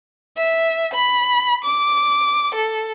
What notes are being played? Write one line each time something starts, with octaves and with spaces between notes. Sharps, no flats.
E5
B5
D6
A4